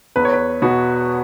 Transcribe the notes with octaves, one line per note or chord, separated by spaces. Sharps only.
E2 B4
C#5
B4
B2 B3 F#4